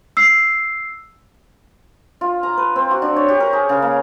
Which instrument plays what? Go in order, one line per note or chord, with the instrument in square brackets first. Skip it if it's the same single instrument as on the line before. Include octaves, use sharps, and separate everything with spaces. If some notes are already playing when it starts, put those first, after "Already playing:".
[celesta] E6 C7
[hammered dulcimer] F4
A#5
B4
C4
F#4
D4
C#5
G4
A#4
G#4
C#3
A#3